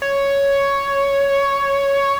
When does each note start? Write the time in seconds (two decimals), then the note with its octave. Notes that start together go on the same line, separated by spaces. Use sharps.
0.02 C#5